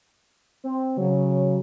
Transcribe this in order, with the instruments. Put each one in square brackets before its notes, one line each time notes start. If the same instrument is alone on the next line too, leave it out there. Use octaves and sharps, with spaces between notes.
[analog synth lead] C4
[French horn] C#3 [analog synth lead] F#3